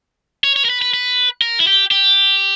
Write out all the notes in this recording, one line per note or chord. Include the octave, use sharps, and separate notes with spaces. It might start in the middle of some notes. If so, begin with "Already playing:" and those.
C#5
C#5
A#4
B4
B4
B4
A#4
E4
G4
G4